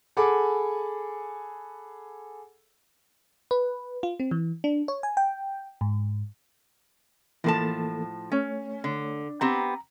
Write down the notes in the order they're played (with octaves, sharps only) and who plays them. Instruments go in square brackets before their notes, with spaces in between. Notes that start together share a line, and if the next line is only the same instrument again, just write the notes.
[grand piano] G#4 A4 F#5 G#5 B5 D6
[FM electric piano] B4
F4
C4
E3
D4
C#5
G#5
G5
G#2
[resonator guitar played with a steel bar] A2 F3 A5 [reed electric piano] E3 A#3 A4
[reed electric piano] A3 C#5 [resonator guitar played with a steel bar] C#4
[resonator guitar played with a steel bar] D3
[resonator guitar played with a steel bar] B3 C4 G4 [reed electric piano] A#5